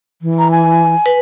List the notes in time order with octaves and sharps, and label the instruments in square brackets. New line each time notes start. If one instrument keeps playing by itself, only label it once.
[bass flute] E3
[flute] A#5
G#5
[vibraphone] B4